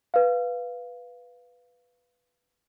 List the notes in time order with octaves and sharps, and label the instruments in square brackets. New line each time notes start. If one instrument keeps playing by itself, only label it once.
[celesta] B4 F5